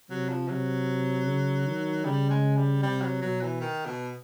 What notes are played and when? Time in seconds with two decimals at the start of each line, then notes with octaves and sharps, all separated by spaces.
0.10 C3 F#3
0.29 F3
0.48 C3 F#3
1.26 C#3
1.66 D#3
2.05 C#3 G3
2.30 G#3
2.57 G3
2.83 C3 G3
3.02 F#3
3.22 B2 F#3
3.41 E3
3.60 D#3
3.86 B2